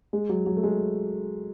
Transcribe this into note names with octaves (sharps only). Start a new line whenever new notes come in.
G#3
F#3
F#3
A3
G#3